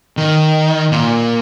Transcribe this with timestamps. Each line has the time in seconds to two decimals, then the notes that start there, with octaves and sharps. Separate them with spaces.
0.17 D#3
0.92 A#2